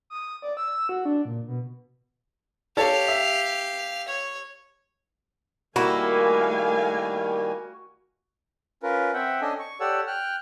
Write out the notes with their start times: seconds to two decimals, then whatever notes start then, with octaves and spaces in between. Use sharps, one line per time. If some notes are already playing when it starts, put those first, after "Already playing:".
0.10 D#6
0.42 D5
0.57 E6
0.89 F#4
1.05 D4
1.25 A#2
1.48 B2
2.77 G4 A4 C#5 F5 A5
3.08 E5
4.08 C#5
5.76 D#3 G3 A3 A#3 E4 F#4 F5 G#5
8.83 C#4 F4 A#4 B4
9.13 C4 E5 F#5 G5
9.41 C#4 D4 A4 D#5 G#5
9.59 C#6
9.80 G4 A4 C#5 D5 F#5 E6
10.07 G5 F6 F#6